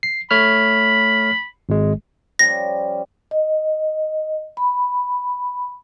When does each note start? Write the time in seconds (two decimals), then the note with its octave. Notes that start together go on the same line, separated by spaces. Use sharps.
0.03 C7
0.31 A3 C#5 B5 F6
1.69 G#1 G#3
2.39 F3 G3 C#4 A#6
3.31 D#5
4.57 B5